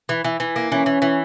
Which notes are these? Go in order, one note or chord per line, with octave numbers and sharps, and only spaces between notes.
E3
E3
E3
A#3
E3 C#4
E3
E3